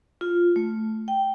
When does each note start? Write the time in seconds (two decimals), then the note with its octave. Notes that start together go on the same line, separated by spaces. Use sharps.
0.21 F4
0.56 A3
1.08 G5